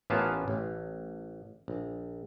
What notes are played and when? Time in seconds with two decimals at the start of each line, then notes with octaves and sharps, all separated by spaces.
0.10 A1 A#3 B3 C#4 F4 A5
0.48 A1
1.68 A#1